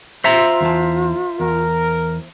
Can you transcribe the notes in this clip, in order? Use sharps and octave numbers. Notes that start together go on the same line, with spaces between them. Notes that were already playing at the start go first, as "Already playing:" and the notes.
F4 C5 E5 A#5
E2 E3 A5
E2 A#4